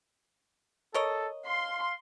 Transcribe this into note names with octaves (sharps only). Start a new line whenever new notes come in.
A4 A#4 C#5 D#5
F5 C6